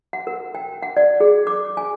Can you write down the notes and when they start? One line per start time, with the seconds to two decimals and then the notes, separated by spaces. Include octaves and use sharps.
0.13 F#5
0.27 A#4
0.55 G5
0.82 F#5
0.97 D5
1.20 G#4
1.47 D6
1.77 G#5